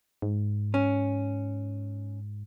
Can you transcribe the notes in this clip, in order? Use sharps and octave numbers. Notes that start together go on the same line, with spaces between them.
G#2
C#4